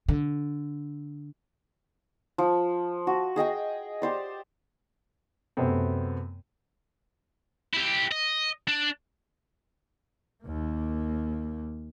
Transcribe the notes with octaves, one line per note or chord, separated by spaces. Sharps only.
D3
F3
F#4
G#4 D#5 G5 G#5
G4 C5 D5
F#2 C3 A3 B3 C4
E4 G4
D#5
D4
D#2 A#3